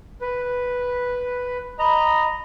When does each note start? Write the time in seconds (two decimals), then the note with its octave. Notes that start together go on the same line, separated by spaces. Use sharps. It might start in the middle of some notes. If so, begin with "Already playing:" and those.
0.21 B4
1.79 D#5 A#5 B5